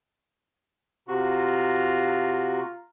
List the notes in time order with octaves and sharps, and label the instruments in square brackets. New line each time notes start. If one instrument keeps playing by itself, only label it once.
[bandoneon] C3 F#4 [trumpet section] F4 A#5